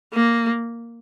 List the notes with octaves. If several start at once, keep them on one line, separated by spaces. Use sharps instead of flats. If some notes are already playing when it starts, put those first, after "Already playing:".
A#3